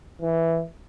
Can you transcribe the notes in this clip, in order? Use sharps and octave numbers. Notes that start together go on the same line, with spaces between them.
E3